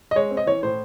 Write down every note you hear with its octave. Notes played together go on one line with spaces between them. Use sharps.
D#5
G#3 C#5
C4
D#5
E3 C#5
A2 C5